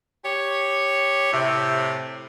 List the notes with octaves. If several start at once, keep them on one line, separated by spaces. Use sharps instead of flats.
G4 C#5
A2 C3